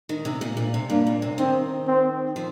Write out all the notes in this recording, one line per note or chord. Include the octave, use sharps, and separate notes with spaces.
D#3
C3
A#2
A#2
C3
G2 A#3
A#2
C3
D#3 C4
C4
F3